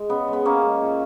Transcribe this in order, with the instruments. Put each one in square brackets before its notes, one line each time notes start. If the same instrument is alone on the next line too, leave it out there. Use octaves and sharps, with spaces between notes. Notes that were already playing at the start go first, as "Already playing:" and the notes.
Already playing: [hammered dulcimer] G#3
C#3 B3
G#3
B3
C#3 A#3 C#4
G#3
A#2